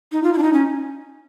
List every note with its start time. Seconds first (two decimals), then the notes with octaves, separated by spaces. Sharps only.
0.12 D#4
0.23 F4
0.34 E4
0.38 D4
0.43 D#4
0.53 C#4